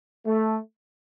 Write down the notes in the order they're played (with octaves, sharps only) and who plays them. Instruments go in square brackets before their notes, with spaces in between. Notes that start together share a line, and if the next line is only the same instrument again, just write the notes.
[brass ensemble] A3